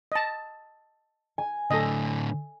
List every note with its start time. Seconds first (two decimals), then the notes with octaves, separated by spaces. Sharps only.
0.12 D#5 A5
1.38 G#5
1.71 A2 D3 A4 D#5